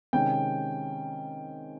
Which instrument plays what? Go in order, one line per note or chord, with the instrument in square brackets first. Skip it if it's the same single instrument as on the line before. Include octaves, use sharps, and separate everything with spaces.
[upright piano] C3 D#3 G#3 C#4 G5